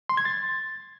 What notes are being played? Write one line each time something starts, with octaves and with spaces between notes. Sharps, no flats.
C6
G#6
A6